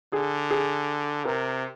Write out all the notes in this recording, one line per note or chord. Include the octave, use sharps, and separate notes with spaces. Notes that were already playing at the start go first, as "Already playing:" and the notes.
D3 G#4
G#4
C3 A#4